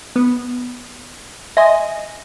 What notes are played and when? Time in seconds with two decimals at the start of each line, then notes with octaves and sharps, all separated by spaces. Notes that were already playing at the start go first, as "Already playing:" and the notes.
0.16 B3
1.57 D#5 E5 G#5 C6 A#6